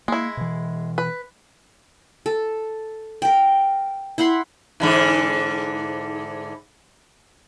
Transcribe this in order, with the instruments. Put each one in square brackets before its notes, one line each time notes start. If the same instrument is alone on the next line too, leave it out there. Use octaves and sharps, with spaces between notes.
[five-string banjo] G#3 E4 [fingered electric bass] A#3
[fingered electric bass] B2 E3
[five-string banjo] B4
[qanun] A4
A#4 G5
E4 F#5 B5 C6
[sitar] G#2 D3 E3